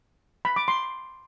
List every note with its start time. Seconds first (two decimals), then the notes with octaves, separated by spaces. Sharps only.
0.45 B5
0.56 D6
0.68 C6